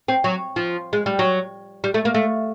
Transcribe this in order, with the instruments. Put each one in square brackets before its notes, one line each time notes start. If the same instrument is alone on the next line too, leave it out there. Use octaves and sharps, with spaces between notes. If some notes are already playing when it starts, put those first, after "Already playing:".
[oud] C4
F#3
F3
G#3
G3
F#3
G3
A3
A#3
A3